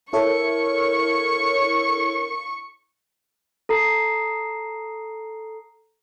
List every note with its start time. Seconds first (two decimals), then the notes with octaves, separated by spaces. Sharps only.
0.13 E4 A4 A#4 C#5 C#6
3.69 A4 A#5 C7